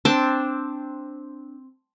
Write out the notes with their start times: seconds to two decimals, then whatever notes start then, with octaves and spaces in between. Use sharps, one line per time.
0.05 C4 D4 A5 D6